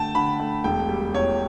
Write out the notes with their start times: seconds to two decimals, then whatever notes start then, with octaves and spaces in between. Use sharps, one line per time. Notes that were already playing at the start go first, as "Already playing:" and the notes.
Already playing: D3 A3 G5 A5
0.15 D3 B5
0.40 A3
0.64 E1 G5
0.89 G3
1.14 E2 C#5